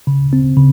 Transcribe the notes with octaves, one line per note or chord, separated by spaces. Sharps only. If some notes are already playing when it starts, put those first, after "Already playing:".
C#3
C4
C#3